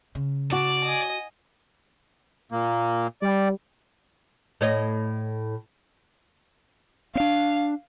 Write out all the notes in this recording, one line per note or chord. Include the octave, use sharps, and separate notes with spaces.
C#3
F#4 D5 A5
D#5 G#5
A#2 A#3
G3 D5
A2 C#5 D#5
C4 D4 F5